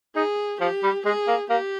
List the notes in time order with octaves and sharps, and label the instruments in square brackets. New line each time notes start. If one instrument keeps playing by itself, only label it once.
[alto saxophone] D#4 [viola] G#4
[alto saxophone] F3 [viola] G4
[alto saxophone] G3
[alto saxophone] G#3 [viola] G#4
[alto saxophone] A#3
[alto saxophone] A#3 [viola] G4